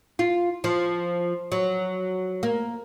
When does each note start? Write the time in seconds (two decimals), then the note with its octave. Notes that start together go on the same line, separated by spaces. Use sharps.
0.19 F4
0.64 F3
1.52 F#3
2.43 A#3